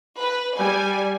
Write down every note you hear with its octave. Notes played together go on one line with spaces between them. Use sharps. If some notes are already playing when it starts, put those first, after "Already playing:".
B4
G3 G#5